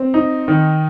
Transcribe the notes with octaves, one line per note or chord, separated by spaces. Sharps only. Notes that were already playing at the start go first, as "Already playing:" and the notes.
Already playing: C4
D#4
D#3